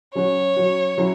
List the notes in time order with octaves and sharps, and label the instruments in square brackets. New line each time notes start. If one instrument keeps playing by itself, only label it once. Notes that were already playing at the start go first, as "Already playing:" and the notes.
[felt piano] F#3 C#4 F#4 [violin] C#5
[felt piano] F#3 C#4 F#4
F#3 C#4 E4